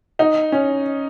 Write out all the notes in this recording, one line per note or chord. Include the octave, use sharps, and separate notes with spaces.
D#4
C#4